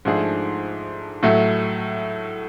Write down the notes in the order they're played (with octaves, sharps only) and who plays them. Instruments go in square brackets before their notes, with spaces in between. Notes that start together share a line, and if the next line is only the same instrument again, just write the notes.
[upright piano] G#2 F3 A3 D4 G#4
A2 F#3 A3